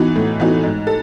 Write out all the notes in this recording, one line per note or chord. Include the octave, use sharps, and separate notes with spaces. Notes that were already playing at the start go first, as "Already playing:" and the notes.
Already playing: E3 B3 D#4 F#4
A2
E3 B3 D#4 F#4
G#2
A4